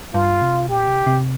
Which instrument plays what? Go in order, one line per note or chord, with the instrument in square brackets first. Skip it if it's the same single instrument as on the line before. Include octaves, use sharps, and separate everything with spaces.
[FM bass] G2 [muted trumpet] F4
[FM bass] C3
[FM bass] A#2 [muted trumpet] G4
[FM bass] C3
C3